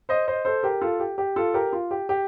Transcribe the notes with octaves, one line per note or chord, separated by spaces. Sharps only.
C5 D#5
C5 D#5
A4 C5
G4 A#4
F4 A4
G4
G4
F4 A4
G4 A#4
F4
G4
G4